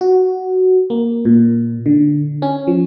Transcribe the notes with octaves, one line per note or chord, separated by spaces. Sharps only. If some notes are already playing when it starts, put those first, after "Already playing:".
F#4
A#3
A#2
D3
C#4
F3